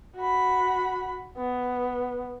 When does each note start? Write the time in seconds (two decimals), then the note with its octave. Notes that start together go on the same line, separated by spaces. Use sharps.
0.16 F#4 B5
1.37 B3